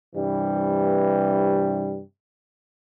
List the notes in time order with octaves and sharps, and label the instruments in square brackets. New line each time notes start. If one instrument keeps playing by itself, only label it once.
[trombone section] G2 C3 E3 G3